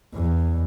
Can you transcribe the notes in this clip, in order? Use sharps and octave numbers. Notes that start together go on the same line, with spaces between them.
E2